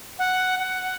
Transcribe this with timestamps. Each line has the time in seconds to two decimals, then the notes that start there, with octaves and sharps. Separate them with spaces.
0.19 F#5
0.59 F#5